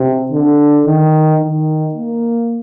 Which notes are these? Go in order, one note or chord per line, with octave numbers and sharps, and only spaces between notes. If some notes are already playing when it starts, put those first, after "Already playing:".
Already playing: C3
D3
D#3
D#3
A#3